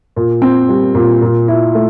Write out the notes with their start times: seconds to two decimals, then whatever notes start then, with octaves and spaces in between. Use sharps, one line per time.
0.16 A#2
0.42 C4
0.69 G3
0.94 A#2
1.22 A#2
1.48 E4
1.74 A3